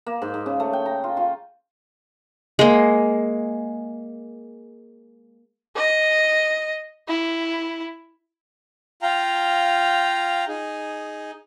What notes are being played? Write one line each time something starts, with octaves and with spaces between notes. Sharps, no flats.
A#3
G#2
G#2
C#3
A3
G5
A#5
F4
F4
G#3 A#3
D#5
E4
F4 F5 G5 A#5
D#4 G#4